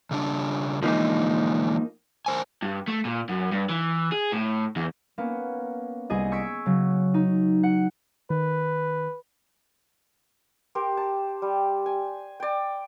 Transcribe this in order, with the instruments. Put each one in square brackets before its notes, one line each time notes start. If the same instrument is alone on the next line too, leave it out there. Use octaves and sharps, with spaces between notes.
[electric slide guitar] C#3 G3 D4
[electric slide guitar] D3 E3 G#3 [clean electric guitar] F3 A#3 D#4
[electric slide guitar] A#4 C5 G#5
[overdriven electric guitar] G2
A3
A#2
F#2
G2
E3
G#4
A2
E2
[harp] A#3 B3 C#4
C2 G#4 D#5
C#6 E6 G#6 B6 D7
C#3 F#3
D#4
F#5
[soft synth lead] D#3 [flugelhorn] B4
[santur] G4 A#4 C5
A5
G3
G#5
D5 G5